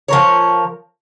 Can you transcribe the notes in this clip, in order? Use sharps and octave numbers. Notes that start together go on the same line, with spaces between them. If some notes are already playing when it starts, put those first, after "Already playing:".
F3 A#4 C#5